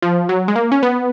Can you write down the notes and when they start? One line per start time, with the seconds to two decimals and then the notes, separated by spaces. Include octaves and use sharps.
0.02 F3
0.29 F#3
0.48 G#3
0.56 A#3
0.72 C#4
0.83 B3